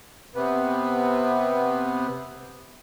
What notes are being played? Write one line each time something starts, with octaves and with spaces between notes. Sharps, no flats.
C3 B3